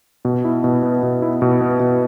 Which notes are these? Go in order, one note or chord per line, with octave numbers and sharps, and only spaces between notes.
B2
E4
B2
B3
B2
E4
B2
B3
B2